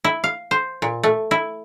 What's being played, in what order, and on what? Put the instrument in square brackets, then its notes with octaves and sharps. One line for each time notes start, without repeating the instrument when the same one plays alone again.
[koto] E4
F5
C5
A#2
A3
E4